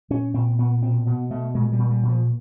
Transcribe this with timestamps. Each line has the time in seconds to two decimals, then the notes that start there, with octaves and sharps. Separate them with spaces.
0.10 A#2 C#4
0.34 A#2 C4
0.58 A#2 B3
0.82 B2 C4
1.07 B2 B3
1.30 B2 A3
1.55 A#2 G#3
1.72 G3
1.78 A#2
1.90 G3
2.03 A#2
2.09 F3